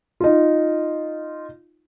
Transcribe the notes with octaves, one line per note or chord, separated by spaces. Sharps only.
D#4 F4